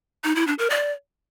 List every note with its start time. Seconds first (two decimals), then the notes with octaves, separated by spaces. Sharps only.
0.24 D#4
0.36 E4
0.47 D4
0.59 A#4
0.70 D5